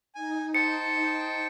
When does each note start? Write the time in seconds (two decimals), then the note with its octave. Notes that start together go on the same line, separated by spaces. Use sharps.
0.15 D#4 G#5
0.55 C5 G5 A5 C#7